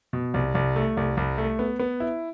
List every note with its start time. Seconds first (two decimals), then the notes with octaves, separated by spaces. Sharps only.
0.13 B2
0.34 C2
0.55 C2
0.76 A3
0.97 C2
1.17 C2
1.38 A3
1.59 B3
1.79 B3
2.00 E4